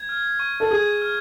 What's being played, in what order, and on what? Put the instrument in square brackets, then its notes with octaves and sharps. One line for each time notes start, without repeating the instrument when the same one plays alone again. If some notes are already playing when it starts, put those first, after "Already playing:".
Already playing: [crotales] G#6
F6
C#6
[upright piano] A4
[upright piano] G#4 [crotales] G#6
[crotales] F6